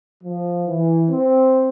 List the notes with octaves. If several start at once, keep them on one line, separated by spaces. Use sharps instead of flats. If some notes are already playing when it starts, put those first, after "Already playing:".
F3
E3
C4